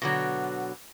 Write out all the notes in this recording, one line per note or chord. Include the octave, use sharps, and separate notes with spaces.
B2 D3 F#3